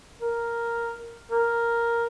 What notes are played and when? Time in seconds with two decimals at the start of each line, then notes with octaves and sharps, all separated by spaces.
0.21 A#4
1.31 A#4